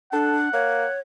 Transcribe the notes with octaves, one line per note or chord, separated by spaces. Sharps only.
D4 A4 F#5
A#3 C#5